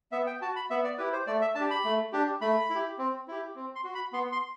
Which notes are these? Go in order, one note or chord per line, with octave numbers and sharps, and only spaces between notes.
B3 E5
G5
F#4 A5
B5
B3 E5
D5
E4 G4 B4
C5
A3 D5
E5
D4 A5
G4
B5
A3
D4 G4
A3 B5
E4
G4
C4
E4 G4
C4
C6
F#4
B5
B3 C6
C6